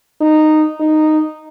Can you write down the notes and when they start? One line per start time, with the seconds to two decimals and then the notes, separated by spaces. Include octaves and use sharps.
0.21 D#4
0.80 D#4